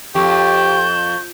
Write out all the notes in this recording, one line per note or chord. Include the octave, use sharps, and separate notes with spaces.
F2 G4 C#6 G6